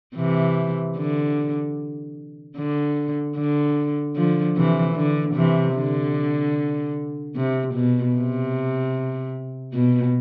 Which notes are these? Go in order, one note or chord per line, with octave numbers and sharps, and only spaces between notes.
C3 E3
D3
D3
D3
D3 F3
C3 E3
D3
C3 E3
D3
C3
B2
C3
B2